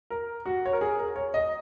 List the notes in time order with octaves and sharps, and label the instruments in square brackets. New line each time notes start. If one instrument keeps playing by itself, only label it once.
[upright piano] A#4
F#4
C#5
A#4
G#4
A#4
C#5
D#5